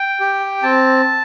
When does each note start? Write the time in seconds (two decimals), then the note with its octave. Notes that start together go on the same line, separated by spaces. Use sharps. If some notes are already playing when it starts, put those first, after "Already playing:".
Already playing: G5
0.20 G4
0.63 C4 A5